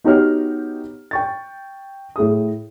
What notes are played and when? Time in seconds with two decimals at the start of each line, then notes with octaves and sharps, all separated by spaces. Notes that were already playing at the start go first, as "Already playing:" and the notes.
0.04 B3 D#4 F#4 G4 C#5 F6
1.11 G5 C#6 A6
2.16 A2 G#4 D#6